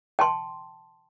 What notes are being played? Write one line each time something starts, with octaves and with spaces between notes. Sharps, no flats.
G5 A5 C6